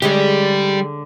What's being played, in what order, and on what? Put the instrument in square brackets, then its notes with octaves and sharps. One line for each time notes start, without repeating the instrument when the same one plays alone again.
[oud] D3 G#3 C#4 [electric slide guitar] G3 G4